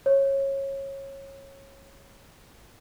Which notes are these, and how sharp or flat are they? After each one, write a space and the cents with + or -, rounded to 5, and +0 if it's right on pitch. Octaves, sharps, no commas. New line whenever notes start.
C#5 -20